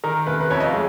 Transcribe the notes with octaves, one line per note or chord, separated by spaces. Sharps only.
D#3 A#4
F1 B4
B4
F2 C#5
D#5
F5
G#3